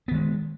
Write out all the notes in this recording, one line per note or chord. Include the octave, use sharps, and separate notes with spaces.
D#3 G#3 B3